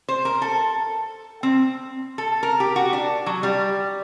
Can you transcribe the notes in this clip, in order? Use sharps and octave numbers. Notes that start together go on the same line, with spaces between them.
C5
A#4
A4
C4
A4
A#4
G4
F#4
D4
F#3
G3